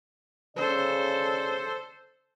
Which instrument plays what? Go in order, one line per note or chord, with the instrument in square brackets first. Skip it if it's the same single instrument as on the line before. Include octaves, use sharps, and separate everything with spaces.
[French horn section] C#3 D5 [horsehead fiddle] A4 C5